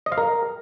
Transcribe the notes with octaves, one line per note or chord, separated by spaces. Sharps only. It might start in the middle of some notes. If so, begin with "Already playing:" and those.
D#5
F5
A#4